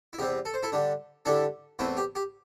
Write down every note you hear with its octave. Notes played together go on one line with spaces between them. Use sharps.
E4
E2 C3 G3 C4 G4
A4
C5
E4 A4
D3 G3 D4
D3 G3 D4 E4 A4
E2 E3 A3 C4 E4
G4
G4